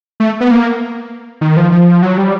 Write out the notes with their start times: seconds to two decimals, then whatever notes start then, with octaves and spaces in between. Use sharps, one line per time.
0.20 A3
0.40 B3
0.51 A#3
1.41 D#3
1.57 F3
1.72 F3
2.02 F#3
2.17 G3